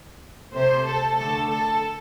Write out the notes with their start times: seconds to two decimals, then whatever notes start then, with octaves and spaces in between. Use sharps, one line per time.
0.53 C3 A3 C5
0.86 A4
1.18 D3 A3 A4
1.50 A4